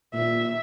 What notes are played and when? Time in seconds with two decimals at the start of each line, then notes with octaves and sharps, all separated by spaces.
0.14 A#2 E5